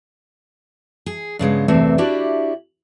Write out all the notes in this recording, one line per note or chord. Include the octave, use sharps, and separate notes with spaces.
G#4
G2 C#3 G#3 B3
E2 G2 C3 A3 A#3 C4
D4 E4 F#4 G4 D5